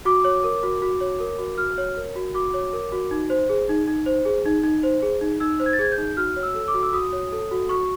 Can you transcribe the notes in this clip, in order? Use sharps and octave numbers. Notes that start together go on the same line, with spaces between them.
F#4 D6
C#5
A#4
F#4
F#4
C#5
A#4
F#4
F#4 F6
C#5
A#4
F#4
F#4 D6
C#5
A#4
F#4
D#4
C5
G#4
D#4
D#4
C5
G#4
D#4
D#4
C5
G#4
D#4
D#4 E6
C5
G#6
A6
G#4 G#6
G6
D#4
F#4 F6
C#5
E6
A4
D6
F#4
E6
F#4 D#6
C#5
A4
F#4
F#4 C#6